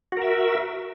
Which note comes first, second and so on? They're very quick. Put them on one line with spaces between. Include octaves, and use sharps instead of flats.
F#4 A#4 E5